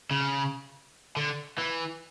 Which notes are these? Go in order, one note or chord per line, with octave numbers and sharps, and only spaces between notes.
C#3
D3
E3